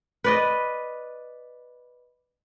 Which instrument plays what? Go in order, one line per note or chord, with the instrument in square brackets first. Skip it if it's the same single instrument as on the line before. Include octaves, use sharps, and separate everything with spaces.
[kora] B4 D5 D#5